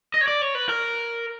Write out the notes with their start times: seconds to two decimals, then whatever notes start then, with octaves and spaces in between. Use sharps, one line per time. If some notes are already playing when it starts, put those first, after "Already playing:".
0.14 D#5
0.21 C#5
0.27 D5
0.42 C#5
0.55 B4
0.69 A#4